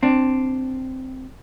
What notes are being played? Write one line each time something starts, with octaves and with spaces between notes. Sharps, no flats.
C4 D4